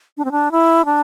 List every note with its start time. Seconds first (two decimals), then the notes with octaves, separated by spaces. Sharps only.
0.17 D4
0.25 C4
0.32 D4
0.51 E4
0.85 D4